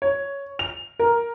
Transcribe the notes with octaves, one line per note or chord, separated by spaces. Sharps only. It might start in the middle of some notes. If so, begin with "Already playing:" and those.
C#5
F7
A#4